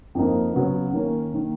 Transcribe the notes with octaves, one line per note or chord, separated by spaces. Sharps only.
F2 F3 A#3 D#4
C#3 F#3 B3
D#3 A#3 C#4
D#3 A#3